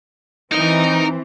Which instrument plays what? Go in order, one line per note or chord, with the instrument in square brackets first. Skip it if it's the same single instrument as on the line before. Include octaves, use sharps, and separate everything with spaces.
[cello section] E3 C4 [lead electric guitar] D#4 D#5 [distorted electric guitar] A#4